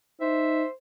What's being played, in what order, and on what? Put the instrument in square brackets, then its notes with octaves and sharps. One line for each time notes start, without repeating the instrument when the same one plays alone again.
[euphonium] D#4 [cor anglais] C5 [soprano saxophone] E5